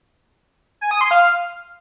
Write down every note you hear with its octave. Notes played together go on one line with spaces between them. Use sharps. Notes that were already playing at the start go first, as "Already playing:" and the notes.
G#5
D#6
C6
F5